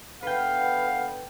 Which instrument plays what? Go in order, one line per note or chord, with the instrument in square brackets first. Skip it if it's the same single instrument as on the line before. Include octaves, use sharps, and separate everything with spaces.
[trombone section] D3 B3 [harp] B4 G5 [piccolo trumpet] F5